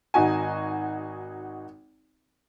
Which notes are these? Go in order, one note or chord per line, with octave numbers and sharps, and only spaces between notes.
G#1 D#4 F#4 G#5